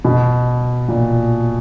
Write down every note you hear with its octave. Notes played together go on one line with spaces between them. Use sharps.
B2
A#2